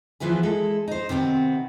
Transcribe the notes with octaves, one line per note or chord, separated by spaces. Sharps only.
E3 F3 B3 E4 G#4
G#3 E4 A4
D#4 C5
C3 D#3 B3 C4